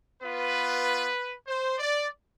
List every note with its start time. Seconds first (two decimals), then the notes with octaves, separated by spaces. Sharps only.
0.21 B3 F4 B4
1.47 C5
1.78 D5